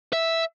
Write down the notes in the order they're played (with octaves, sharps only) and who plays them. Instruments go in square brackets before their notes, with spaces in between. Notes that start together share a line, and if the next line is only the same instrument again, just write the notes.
[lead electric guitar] E5